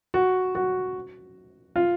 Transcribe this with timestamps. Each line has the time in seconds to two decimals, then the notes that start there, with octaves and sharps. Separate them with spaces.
0.14 F#4
0.55 F#4
1.76 F4